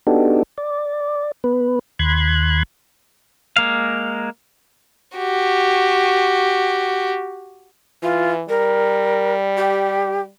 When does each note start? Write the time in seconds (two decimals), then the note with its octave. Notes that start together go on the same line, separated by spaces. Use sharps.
0.07 B3 D4 D#4 F#4 G4 A4
0.58 D5
1.44 B3 B4
1.99 D#2 B5 C6 F#6 G#6
3.56 G#3 A#3 F5
5.17 F#4 G4
8.03 E3 F4
8.49 G3 A#4
9.57 G4